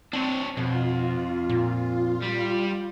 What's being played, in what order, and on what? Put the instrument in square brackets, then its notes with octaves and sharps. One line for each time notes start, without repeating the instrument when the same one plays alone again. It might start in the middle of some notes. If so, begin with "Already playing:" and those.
[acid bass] C4 [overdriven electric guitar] D4 C#5
[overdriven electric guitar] F2 [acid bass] B2 [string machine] F4
[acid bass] A#2
[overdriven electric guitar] G3